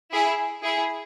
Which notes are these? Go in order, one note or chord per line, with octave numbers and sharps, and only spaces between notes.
E4 G#4
E4 G#4